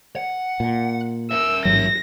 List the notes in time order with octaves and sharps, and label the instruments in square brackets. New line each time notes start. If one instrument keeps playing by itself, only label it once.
[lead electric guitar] F#5
[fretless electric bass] A#2
[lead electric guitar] A#4 E5 [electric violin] E6
[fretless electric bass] A1 G#2 F#3 [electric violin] A#6